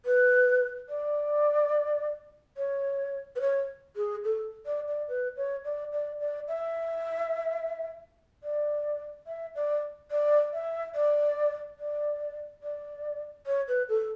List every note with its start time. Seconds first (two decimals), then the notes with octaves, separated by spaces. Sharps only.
0.05 B4
0.89 D5
2.57 C#5
3.35 B4
3.40 C#5
3.96 G#4
4.24 A4
4.65 D5
4.87 D5
5.08 B4
5.36 C#5
5.64 D5
5.92 D5
6.20 D5
6.48 E5
8.43 D5
9.27 E5
9.55 D5
10.10 D5
10.53 E5
10.95 D5
11.78 D5
12.62 D5
13.46 C#5
13.67 B4
13.88 A4